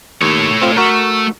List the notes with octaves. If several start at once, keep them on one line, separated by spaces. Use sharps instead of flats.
D#2 A3 C#5
C4 F4
A3 F#4 A#4